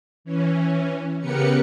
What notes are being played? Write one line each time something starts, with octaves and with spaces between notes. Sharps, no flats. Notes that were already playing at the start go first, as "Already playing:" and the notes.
E3 C#4
C#3 B3 G4 A#4 B4 C#7